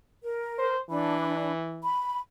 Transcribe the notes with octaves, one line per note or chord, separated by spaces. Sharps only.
A#4
C5
E3 D4 B5
B5